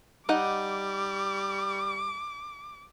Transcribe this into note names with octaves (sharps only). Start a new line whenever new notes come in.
G3 D#4 D#5 F#5 D6